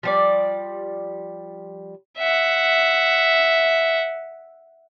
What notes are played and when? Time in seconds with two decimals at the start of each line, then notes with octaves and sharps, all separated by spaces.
0.03 F3 G3 D5
2.19 E5 F#5